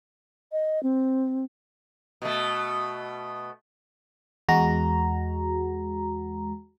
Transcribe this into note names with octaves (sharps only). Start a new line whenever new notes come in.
D#5
C4
B2 A3
E2 G#3 F#4 A#5